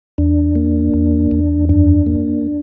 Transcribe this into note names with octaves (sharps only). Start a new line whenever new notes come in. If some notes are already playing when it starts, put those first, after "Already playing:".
E2 D4
A#3
E2
E2
F#2 D4
A#3